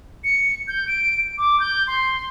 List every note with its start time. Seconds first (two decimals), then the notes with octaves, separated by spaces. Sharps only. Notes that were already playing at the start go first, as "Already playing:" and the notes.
0.24 C#7
0.68 G6
0.88 D7
1.38 D6
1.60 G6
1.87 C6